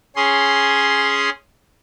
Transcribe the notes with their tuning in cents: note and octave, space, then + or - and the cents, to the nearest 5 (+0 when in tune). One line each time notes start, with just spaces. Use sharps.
C#4 +0 G#4 +0 C6 +0